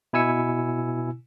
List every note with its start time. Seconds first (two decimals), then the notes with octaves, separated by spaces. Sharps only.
0.13 B2 E4 G#5 E6 C#7